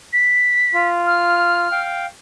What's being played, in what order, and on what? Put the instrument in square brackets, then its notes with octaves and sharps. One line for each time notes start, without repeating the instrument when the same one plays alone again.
[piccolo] B6
[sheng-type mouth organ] F4
[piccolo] F6
[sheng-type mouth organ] F5 G5